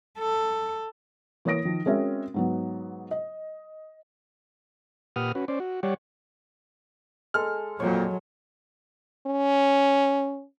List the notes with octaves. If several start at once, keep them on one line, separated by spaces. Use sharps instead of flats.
A4
E3 A#3 C#5 D#6 A#6 D7
D#3 F3
G#3 C4 C#4 F#4 A#4 E5
G#2 F#3 B3
D#5
A#2 G4 B4 F#5 D#6 F6
C#4 F#4 B4
C#4 C5 D5
F#4
G3 G4 C#5 D5 F#5
G#3 A4 F6
F2 A#2 F#3 C#5
C#4